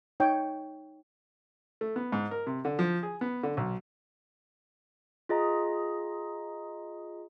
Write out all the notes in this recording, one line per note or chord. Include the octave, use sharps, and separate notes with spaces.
D#4 C#5 G5
A3
B3
G#2
A#4
C3
D3
F3
G#4
B3
D3
B1
F4 G#4 D#5 A#5